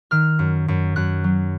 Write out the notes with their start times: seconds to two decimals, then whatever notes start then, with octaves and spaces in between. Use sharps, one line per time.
0.11 D#3 F6
0.39 F#2
0.68 F#2
0.96 F#2 F#6
1.24 F#3